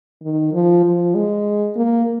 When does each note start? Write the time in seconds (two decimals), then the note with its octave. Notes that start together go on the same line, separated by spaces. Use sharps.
0.22 D#3
0.53 F3
0.84 F3
1.15 G#3
1.76 A#3